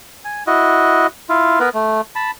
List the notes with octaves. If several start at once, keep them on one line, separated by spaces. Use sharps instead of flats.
G#5
E4 F#4 D#5
E4 F4
B3 A#4 B4
A3
A5 B5